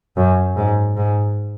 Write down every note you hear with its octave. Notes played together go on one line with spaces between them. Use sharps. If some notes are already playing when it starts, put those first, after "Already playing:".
F#2
G#2
G#2